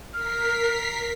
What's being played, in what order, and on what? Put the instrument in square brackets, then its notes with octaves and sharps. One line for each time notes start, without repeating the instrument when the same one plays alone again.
[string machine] A#4 B6 C7 [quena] F6